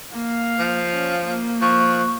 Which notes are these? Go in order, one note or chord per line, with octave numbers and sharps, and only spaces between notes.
A#3 F5
F3
C#4
A#3
F3 C#6 F#6